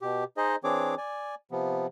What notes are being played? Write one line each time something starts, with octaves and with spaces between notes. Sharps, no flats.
B2 G4
D#4 G#4 C5 D#5
E3 C4 D4 G#4 C#5 D6
D5 G#5
C3 F3 B3